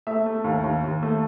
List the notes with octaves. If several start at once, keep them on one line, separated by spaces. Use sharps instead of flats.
A3 E5
A3
D#2
D#2
D#2
A3